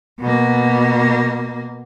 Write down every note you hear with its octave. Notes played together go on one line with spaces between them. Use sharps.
B2 A#3